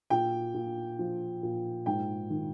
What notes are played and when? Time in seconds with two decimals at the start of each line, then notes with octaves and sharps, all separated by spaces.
0.10 A#2 G5
0.54 A#2
0.99 F3
1.43 A#2
1.86 G#2 G5
2.30 D#3